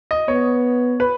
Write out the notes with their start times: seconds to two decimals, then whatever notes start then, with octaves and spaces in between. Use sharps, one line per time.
0.11 D#5
0.28 B3 C#5
1.00 B4